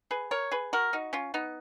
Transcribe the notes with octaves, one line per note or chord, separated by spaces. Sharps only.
G#4 B4
A#4 C#5
G#4 B4
F#4 A#4
D#4 F#4
C#4 F4
B3 D#4